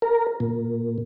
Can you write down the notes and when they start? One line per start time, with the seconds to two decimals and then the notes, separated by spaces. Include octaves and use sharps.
0.02 A#4
0.40 A#2